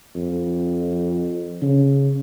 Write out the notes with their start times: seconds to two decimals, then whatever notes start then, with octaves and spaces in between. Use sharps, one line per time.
0.15 F2
1.62 C#3